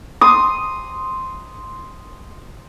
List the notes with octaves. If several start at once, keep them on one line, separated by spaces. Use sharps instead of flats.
C6 D#6